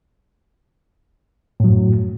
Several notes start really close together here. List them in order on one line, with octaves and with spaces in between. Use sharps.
A2 F#3 F#2